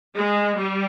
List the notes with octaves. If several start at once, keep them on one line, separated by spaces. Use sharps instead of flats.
G#3
G3